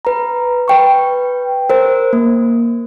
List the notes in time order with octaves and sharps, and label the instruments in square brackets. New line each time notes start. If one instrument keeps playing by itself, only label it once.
[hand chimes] B4 A#5
B4 G5 C#6
A#4 C5
A#3